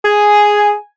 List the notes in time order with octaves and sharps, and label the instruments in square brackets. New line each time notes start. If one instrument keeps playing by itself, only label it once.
[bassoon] G#4 [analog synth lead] G#5